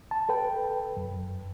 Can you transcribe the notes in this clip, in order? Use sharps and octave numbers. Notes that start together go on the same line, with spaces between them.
A5
A4 B4 G5
F#2